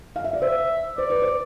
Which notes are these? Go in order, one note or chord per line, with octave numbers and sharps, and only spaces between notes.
F5
E5
D5
C5 E5
C5 D5
B4
C5